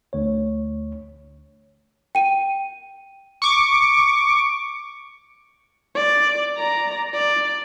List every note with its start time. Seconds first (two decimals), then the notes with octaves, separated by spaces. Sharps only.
0.13 D2 C#5
2.15 G5 D#7
3.42 C#6 D6
5.95 D5
6.57 D5 A#5
7.14 D5